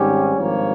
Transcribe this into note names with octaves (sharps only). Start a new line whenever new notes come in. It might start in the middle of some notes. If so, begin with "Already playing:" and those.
Already playing: G#1 G#2 G3 C#4 G4
G#1 G2 F3 A#3 C#5